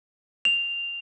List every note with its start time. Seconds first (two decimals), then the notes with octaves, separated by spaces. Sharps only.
0.45 F7